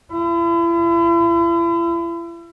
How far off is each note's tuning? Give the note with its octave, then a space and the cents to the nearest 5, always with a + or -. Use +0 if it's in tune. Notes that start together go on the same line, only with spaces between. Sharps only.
E4 +40